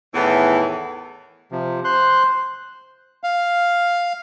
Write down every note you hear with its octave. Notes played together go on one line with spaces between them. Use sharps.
E2 A2 D#3 E3
C3 F3
C5 C6 F#6
F5